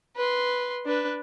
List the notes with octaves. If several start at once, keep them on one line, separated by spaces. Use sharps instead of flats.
B4 C6
D4 B4